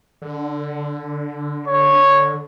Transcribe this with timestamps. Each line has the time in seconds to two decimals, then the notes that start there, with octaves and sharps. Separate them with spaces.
0.22 D3
1.67 C#5